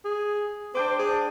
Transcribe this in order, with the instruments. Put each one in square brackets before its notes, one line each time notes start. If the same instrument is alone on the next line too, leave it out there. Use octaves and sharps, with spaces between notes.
[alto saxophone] G#4
[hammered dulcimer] D4 G5 D6 [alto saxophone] C5
[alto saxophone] G#4